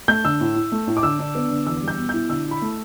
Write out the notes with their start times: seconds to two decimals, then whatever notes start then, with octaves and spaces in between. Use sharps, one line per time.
0.08 A3 G6
0.25 D3 E6
0.41 A2
0.56 E4
0.72 A3
0.87 A2
0.97 D6
1.03 D3 E6
1.19 D4
1.35 B3
1.51 D3
1.67 E2 E6
1.82 G3
1.88 G6
1.98 B2
2.09 E4 G6
2.30 D3 E6
2.46 E4
2.51 B5
2.62 A3